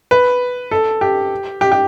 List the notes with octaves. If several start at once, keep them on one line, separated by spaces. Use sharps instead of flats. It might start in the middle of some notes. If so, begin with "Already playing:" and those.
B4
A4
G4
G4
G4